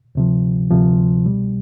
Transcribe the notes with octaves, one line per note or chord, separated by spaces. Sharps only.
D2 C3 F3
D2 C3 F3
C2 B2 G3